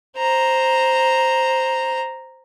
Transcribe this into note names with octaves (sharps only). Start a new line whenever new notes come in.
C5 A#5